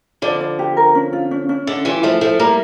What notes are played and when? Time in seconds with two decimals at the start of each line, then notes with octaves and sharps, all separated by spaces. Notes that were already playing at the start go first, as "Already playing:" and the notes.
0.22 D3 F3 D5
0.40 D5
0.59 G4
0.77 A#4
0.95 C#4
1.13 F4
1.31 C#4
1.49 C#4
1.67 D3 E5
1.85 E3 G3 F4
2.03 F3 A3 E5
2.21 F3 A3 A4
2.39 G3 A#3 A#4